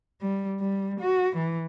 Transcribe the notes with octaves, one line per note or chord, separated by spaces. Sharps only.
G3
G3
F#4
E3